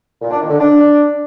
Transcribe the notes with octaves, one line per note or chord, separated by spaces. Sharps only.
A#2
D4
D#3
D3
D4